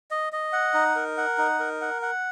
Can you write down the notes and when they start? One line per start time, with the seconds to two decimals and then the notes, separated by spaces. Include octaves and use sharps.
0.11 D#5
0.33 D#5
0.53 F#5
0.74 D#4
0.96 A#4
1.17 F#5
1.38 D#4
1.59 A#4
1.81 F#5
2.02 F#5